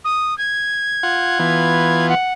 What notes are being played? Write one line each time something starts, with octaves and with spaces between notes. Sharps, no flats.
D#6
G#6
F4 F#5
E3 B3 F4
F#5